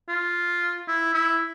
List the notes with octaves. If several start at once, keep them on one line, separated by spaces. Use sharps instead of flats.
F4
E4
E4